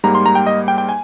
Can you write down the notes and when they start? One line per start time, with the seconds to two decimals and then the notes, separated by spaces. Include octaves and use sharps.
0.04 G#2 G3 A#3 A#5
0.15 C6
0.26 A#5
0.35 G5
0.47 D#5
0.68 G5
0.78 G5
0.89 G#5